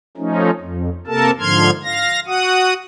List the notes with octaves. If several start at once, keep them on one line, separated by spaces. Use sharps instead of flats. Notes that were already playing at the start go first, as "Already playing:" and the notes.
F3 A3 C#4 D#4
F2
C3 A#3 A4 A#4 A5
G#2 D3 F3 C6 F6 G#6
F5 A#6
F#4 F#5 D#6